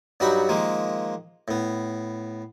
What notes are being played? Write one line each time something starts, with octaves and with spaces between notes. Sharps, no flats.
G2 F#3 G3 D#4 F#4 B5
D#3 F3 G#3 A#3
A2 B3